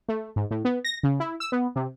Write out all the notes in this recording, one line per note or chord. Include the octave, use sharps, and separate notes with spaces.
A3
G#2
A2
B3
A#6
C#3
E4
E6
B3
C3